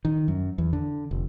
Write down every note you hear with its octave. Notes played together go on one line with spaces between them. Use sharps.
D#3
F#2
E2
D3
F1